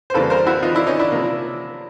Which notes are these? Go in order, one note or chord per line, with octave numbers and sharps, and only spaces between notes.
C5
F2 C#3 E3 G3 A#3 A4 B4
A#4 C5
E4 F#4
D#4 F4
D4 E4
C#4 D#4
D4 E4
C3 F3 A#3